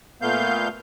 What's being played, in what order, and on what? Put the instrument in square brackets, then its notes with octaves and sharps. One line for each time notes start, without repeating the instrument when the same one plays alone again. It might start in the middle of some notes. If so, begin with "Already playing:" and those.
[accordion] A#2 A3 B3 F5 G6